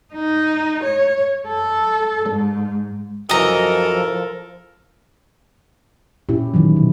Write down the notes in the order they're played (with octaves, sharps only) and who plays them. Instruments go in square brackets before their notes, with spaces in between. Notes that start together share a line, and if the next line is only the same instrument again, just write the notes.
[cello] D#4
C#5
A4
G#2
[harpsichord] F#2 E3 [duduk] F3 [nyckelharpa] A4 A#4 [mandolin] D#5 A#5
[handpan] A#2 C#4 E4 G4
D#3 E3 F#3
B2